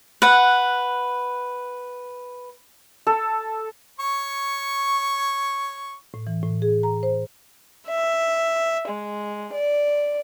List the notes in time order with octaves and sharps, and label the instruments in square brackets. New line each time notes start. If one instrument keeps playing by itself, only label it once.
[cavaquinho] B4 F#5
[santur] A4
[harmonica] C#5 C#6
[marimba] A2
E3
A2
G#4
A#5
C5
[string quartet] E5
G#3
D5